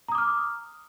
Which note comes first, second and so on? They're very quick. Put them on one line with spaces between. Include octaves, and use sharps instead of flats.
A#5 D#6 D6 F6